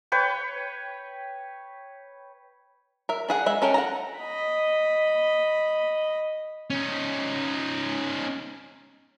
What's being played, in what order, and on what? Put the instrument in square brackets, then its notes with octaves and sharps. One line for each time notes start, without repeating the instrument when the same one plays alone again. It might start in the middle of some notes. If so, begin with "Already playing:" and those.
[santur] B4 C#5 G5
[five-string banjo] A#4 E5
D4 G#4 F#5
G#3 E5
C#4 A4 A#4 G5
F#5 A5 A#5
[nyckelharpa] D#5 B5
[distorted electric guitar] C#4 D#4